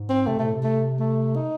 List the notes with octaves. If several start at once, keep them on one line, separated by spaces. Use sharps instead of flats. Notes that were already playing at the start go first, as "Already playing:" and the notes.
Already playing: G#2
C4
C3 A3
C3 A3
A2
C3
A3
A3
D#4